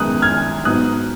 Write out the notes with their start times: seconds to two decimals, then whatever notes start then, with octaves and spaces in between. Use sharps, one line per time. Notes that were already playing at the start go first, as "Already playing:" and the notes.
Already playing: F#2 D#3 G#3 B3 D#4 D#6 F#6
0.22 F6 G#6
0.65 G#2 F#3 B3 D#4 D#6 F#6